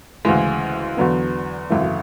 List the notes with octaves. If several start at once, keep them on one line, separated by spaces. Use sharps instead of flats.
D2 C#3 E3 G#3
E2 D3 F#3 B3
G#1 F#2 C#3 E3 A3